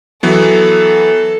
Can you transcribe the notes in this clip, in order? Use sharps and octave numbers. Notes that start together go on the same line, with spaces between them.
E3 F#3 B3 A4